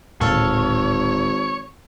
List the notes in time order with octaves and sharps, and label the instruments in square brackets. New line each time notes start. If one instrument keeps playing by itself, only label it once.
[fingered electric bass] D1 A#2 [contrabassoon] G#1 [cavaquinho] A4 F5 [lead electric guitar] C#5